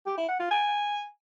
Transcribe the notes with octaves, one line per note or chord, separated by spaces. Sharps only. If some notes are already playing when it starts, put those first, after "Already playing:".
G4
E4
F#5
F4
G#5